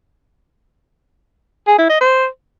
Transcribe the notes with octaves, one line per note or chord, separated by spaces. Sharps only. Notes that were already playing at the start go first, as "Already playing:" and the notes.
G#4
E4
D#5
C5